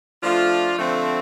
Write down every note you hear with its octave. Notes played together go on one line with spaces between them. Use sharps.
F3 A3 D4 F4
D3 F3 A3 C4